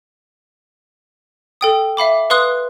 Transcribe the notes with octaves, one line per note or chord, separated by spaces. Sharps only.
A4 G5 D#6
E5 F5 B5 D6
B4 F5 C6 D#6 F#6